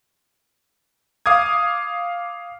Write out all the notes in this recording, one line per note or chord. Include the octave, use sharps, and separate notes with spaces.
F5 D6 D#6 G#6